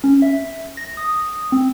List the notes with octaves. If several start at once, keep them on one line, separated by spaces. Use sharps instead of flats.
C#4
E5
A#6
D#6
C4